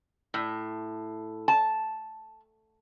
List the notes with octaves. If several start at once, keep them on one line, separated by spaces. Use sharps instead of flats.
A2
A5